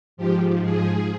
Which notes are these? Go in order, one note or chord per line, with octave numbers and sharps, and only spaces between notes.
G#2 F3 G4
G#4